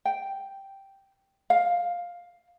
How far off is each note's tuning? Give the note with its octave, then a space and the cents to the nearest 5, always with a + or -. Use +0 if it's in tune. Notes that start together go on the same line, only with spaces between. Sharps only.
G5 -5
F5 +5